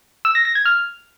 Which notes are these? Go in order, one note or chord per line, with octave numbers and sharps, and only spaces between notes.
E6
A#6
A#6
G#6
F6